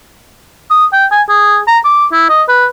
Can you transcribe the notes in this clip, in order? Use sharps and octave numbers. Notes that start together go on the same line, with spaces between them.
D#6
G5
G#5
G#4
A#5
D6
E4
D#5
B4